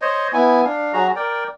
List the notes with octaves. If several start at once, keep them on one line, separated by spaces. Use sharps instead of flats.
C5 C#5 D#5
B3 E4 G#5
D4 F5
F#3 F#4 G#4 A#5
A#4 D5 G5